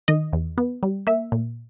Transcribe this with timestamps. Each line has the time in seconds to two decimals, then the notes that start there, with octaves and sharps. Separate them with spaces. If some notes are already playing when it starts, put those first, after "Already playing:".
0.08 D#3 D#5
0.33 E2
0.58 B3
0.83 G3
1.07 A#3 E5
1.32 A#2